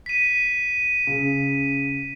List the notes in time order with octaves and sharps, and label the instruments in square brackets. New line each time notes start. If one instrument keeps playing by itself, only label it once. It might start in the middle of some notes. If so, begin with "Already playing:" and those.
[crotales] B6 D#7
[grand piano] C#3